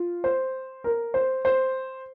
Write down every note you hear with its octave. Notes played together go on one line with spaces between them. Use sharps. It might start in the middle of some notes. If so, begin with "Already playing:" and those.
Already playing: F4
C5
A#4
C5
C5